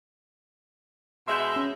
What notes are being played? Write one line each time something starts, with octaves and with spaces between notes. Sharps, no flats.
B2 G#3 E5 C6 G6
C#4